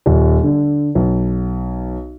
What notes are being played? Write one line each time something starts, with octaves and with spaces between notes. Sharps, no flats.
D#1
D3
B1